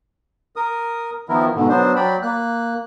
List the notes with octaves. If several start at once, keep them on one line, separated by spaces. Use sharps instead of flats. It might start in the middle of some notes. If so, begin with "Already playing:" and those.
A#4 D#6
D#3 F3 B3 E4 A#4
G#2 B2 D3
F#3 B3 D4 C5
F#3 D5 G5 B5
A#3 F#6